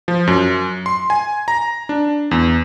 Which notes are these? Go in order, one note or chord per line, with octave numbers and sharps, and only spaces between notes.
F3
F#2
C6
G#5
A#5
D4
E2